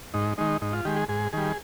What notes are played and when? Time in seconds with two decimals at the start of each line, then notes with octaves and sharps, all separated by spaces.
0.14 G#2 D#4
0.38 D#3 G#3 D#4
0.62 G#2 D#4
0.73 F4
0.85 D#3 G#3 G4
0.96 G#4
1.09 G#2 G#4
1.33 D#3 G3 G#4